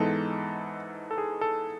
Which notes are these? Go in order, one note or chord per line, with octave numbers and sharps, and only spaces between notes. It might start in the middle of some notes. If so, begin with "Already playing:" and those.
Already playing: G#2 E3 G#3 B3 D#4 A4
A4
G#4
A4